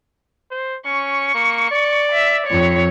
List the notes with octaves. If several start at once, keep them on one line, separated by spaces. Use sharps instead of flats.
C5
C#4 C#6
A#3
D5
E5
F2 C#5